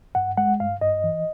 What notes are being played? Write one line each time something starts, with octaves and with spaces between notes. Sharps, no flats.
G2 F#5
G#3 F#5
G2 F5
G2 D#5
E3